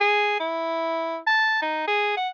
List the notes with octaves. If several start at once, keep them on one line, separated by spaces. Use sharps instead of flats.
G#4
E4
A5
D#4
G#4
F#5